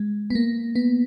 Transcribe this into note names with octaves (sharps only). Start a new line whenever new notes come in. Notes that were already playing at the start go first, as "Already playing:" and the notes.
Already playing: G#3
B3
A#3
B3